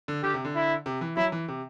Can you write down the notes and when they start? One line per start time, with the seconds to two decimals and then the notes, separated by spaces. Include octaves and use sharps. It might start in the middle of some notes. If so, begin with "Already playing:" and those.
0.08 D3
0.23 D3 G4
0.34 C3
0.45 D3
0.55 E4
0.86 C3
1.01 E3
1.17 F#3 E4
1.32 E3
1.48 C3